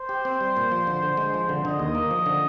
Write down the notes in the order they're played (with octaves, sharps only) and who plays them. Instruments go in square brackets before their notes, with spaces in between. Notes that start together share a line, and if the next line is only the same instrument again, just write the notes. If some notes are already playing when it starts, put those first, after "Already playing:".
Already playing: [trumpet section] C5
[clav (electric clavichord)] G4
C4
G3
A#2
F3
D3
D3
G#3
F3
D3
[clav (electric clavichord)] D3 [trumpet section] D#5
[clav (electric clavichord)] D#2
A#3
F3
D3